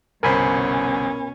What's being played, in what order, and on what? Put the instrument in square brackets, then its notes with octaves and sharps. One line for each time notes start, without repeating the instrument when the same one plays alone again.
[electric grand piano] G1 C2 C5 [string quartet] B2 C#4 [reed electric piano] A#4 G#5 B5